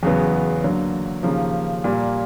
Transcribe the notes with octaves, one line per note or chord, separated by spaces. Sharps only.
E2 C#3 F#3 B3
D3 F#3 A#3
D#2 C#3 F3 A#3
A#2 G3 A#3